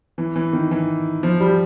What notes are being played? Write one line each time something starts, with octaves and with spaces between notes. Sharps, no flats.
E3
E3
D#3
E3
F3
G3